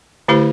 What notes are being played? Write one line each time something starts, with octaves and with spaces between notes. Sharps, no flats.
D3 A3 E4 G4 C5